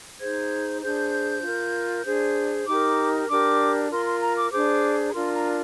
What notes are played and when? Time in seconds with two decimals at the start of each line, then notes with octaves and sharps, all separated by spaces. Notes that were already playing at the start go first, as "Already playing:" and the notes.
0.20 D#4 G#4 C5 G#6
0.81 D4 G#4 C5 G6
1.43 F4 A#4
2.04 D4 G#4 C5
2.66 D#4 G4 A#4 D6
3.28 D4 G4 A#4 D6
3.90 F4 A#4 C6
4.05 C6
4.21 A#5
4.36 D6
4.51 D4 G#4 C5 D6
5.09 A#5
5.13 D4 F4 A#4 C6
5.33 A#5